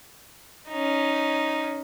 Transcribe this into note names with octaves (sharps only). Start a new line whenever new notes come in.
C#4 D#4